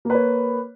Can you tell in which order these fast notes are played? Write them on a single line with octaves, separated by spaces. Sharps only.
A#3 B4 C#5